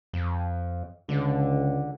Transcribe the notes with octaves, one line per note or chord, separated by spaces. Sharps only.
F2
C#2 D3